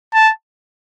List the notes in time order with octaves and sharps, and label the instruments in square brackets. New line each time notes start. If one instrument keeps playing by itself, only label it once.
[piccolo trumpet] A5